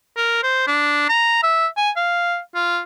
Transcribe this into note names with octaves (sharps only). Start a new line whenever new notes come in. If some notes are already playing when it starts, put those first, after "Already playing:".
A#4
C5
D4
A#5
E5
G#5
F5
F4